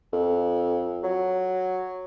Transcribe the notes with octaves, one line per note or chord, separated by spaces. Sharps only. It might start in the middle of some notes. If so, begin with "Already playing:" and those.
F2
F#3